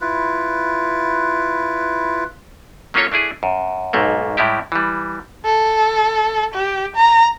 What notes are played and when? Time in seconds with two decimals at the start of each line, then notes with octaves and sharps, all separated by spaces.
0.01 E4 F4 B4
2.94 F#3 A#3 C#4 F4 A4 C#5
3.12 A3 D4 E4 G#4
3.43 F#2
3.93 B1 G#2 A3 A#3
4.37 A2 G3 G#3 E4 G4
4.72 E3 G3
5.45 A4
6.54 G4
6.96 A#5